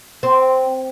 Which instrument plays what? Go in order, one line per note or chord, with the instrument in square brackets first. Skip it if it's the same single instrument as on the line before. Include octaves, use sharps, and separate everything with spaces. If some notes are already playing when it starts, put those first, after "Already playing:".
[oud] C4